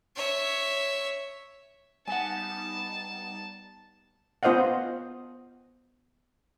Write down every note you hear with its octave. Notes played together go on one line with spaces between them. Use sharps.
C#5 E5
G3 B3 D#4 F#5 G#5 A5
B3 F4 C5 D#5 F5 F#5